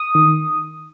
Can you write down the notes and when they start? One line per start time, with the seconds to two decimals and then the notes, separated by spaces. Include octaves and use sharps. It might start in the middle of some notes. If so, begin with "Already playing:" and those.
Already playing: D#6
0.15 D#3